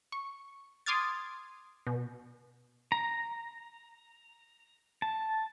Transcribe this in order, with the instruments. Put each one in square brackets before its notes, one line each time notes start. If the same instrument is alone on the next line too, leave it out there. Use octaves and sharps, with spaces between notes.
[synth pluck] C#6
C6 D6 D#6 F6 G#6 A6
B2
[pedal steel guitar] A#5
A5